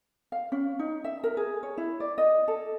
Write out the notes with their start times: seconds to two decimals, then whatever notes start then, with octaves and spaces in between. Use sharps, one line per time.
0.32 F5
0.52 C#4
0.79 D#4
1.04 E5
1.24 A#4
1.37 G#4
1.63 C#5
1.78 E4
2.00 D5
2.18 D#5
2.48 A4